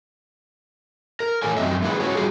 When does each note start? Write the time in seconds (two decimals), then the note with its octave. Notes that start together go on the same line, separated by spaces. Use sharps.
1.20 A#4
1.42 A2 A4 C#5 G#5
1.57 F#2 B2 C4 D#5 E5
1.82 G#3 A#3 D4 E4 G#4 B4
2.00 C#4 E4 F#4 C#5
2.15 G3 G#3 F4 F#4 G#4